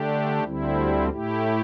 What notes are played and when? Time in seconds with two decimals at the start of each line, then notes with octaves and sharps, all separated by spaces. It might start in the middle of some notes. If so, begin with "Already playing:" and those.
Already playing: D3 A3 D4 G4
0.44 D2 D3 G3 C4 E4
1.10 A2 A3 E4 G4